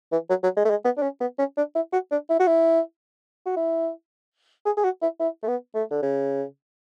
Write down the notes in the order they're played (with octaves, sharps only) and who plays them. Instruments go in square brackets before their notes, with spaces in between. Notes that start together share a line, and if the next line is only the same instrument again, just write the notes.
[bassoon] E3
F#3
F#3
G#3
A3
G#3
B3
D4
C#4
B3
C#4
D4
E4
F#4
D4
E4
F#4
E4
F#4
E4
G#4
G#4
F#4
E4
E4
A3
B3
A3
D3
C#3